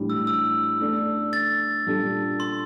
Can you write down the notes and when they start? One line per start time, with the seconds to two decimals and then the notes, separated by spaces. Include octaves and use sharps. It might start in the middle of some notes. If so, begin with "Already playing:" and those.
Already playing: A2 E3 G3 D4 G4
0.10 E6
0.27 E6
0.80 A3 D4 A4 D5
1.33 A6
1.86 A#2 G3 D4 A4
2.40 C6